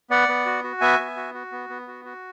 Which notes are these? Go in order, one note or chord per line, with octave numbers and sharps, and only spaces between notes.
B3 D5 F#5
B3
F#4
F#4
B3 E5 G#5
B3
F#4
F#4
B3
B3
F#4
F#4